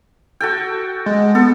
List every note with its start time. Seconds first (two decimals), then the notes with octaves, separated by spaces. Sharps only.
0.41 F#4 A4 G5
1.06 G#3
1.35 B3 A4